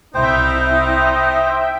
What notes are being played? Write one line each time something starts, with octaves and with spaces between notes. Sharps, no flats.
C2 D#4 E4 C5 E5 G5